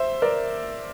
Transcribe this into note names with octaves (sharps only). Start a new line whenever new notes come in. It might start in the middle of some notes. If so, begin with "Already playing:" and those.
Already playing: C5 E5
A#4 D5